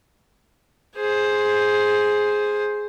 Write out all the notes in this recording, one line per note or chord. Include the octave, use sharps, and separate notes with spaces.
G#4 C5